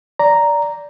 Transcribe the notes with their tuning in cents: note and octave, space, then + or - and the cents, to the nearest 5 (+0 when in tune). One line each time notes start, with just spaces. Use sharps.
D5 -15 A#5 +0